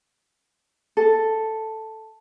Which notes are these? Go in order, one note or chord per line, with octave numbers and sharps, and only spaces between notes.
A4